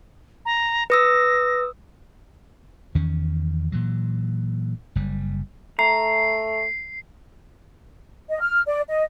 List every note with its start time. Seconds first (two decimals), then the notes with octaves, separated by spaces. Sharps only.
0.45 A#5
0.90 B4 D#6 E6 A#6
2.95 E2 D#3 C#4
3.72 A#2 E3 F#3
4.96 F#1 G3
5.79 A3 A#5 C7
8.29 D#5
8.41 F6
8.66 D5
8.89 D#5